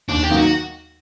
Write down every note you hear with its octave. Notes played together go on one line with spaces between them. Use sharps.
D#2 D4
G4
D#3 F#3 A#3 D#4
F#4